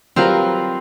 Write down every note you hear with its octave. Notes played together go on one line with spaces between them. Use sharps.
F#3 G3 C4 F4 A#4 B4